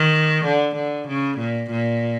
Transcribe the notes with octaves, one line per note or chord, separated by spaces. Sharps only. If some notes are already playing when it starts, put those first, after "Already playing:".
Already playing: D#3
D3
D3
C#3
A#2
A#2